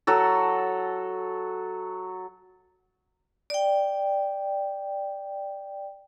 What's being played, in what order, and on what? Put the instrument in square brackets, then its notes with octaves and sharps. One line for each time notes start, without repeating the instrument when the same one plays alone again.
[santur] F#3 F#4 A4
[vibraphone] D5 G5